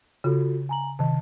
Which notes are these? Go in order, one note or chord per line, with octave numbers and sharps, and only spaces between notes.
C#3 F4 F#4 A4
G#5 A#5 F#7
C3 D#3 A5